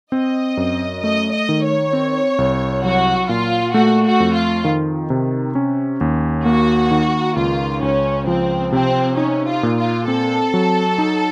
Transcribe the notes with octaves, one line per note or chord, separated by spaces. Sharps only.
C4 D#5
F#2
A3 D#5
D#5
D#3
C#5
C4
C2
F#3 F#4
A#2 F4
A3 F#4
F#4
F2
F4
D#3
C3
C#4
D#2
A#3 F#4
D#3
C#2 F4
C#2 C#4
F3 C4
C3 C4
C#4 D#4
F4
A#2
F4
C4 A4
F#3
D#4